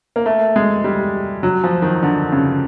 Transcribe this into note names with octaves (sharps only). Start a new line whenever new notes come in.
A#3
A3
G#3
G3
F#3
F3
D#3
D3
C#3